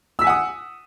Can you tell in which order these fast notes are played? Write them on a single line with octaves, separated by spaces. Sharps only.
E6 B6 G#5 F#5 D#6